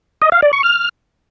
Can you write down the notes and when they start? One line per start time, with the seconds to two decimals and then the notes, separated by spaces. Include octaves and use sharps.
0.22 D#5
0.32 F5
0.42 D5
0.53 C#6
0.63 F6